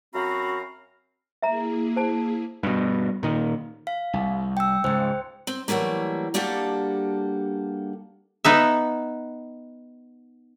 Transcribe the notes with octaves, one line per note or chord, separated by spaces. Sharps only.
F#2 C4 F#4 F5 A#5 B5
A#3 E4 G#4 E5 A#5
C5 A5
G2 B2
A#2 D#3
F5
C2
G5 E6
C#2 G#2 C5 G5
C4
E3 F#3 G3 A3 A#3
G3 A#3 D4 F#4 G4 A4
B3 D#4 E5